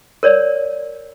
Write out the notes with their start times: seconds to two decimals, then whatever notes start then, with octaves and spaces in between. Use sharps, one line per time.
0.23 A#4 C#5 D5